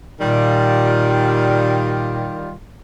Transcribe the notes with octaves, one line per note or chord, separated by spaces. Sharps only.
A#2 D#3 G3 F4